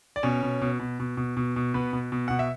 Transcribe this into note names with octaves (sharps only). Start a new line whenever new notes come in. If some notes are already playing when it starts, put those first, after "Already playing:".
D5
B2 C#4 C#5
B2
B2
B2
B2
B2
B2
B2
B2 B3 B4
B2
B2
B2 F#5
E5